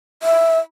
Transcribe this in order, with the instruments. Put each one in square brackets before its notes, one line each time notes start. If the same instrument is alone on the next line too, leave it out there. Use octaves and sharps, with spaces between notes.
[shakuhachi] E5